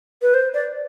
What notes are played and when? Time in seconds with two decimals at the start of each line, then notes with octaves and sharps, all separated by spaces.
0.22 B4
0.34 C5
0.54 D5